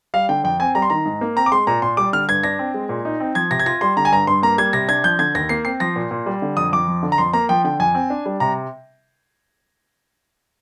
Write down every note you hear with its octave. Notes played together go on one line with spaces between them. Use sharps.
G3 F5
D3 G5
F2 G5
C4 G#5
G3 A#5
C6
D#3 A#5
G#2
A#3
C4 A#5
D6
G#3 C6
A#2 A#5
A#2 C6
G3 D6
D3 F6
G2 G#6
D4 A#6
C4
G#3
A#2
D#4
C4
F3 G#6
C3 A#6
G#6
F4 A#6
G3 C6
D3 A#5
G#5
G2 A#5
G2 C6
A#3 A#5
G3 G#6
C3 A#6
D4 G#6
F3 G6
D3 G#6
D#2 A#6
A#3 C7
C4 C7
F3 A#6
A#2
A#2
G3
D3
F2 D#6
F2 D6
F3
D3
A#5
F2 C6
A#3 A#5
F3 G5
D3 G5
F2 G#5
C4
D4
G3
C3 A#5